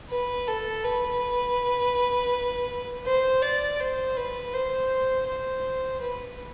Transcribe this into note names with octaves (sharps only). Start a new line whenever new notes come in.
B4
A4
B4
C5
D5
C5
B4
C5
C5
B4